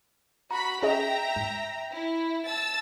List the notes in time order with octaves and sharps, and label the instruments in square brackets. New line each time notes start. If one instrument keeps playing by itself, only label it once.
[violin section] F#4 B5 B6 [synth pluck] A#5
[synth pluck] C#4 G#4 D#5 [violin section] E5 G5 A#5
[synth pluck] G#2
[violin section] E4
A5 E6 A6